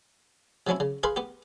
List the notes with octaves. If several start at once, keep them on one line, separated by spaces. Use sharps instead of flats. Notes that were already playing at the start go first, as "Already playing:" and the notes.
C3 F3 F#3 C#4 E4
C#3
G#4 A#4 B4 F5 B5 C6
B3 G4